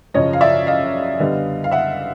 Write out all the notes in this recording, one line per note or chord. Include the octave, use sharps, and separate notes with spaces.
F#2 C#3 F3 C#5 D#5
F5
D5 E5
D#5 F5
D3 G3 B3
F5
E5 F#5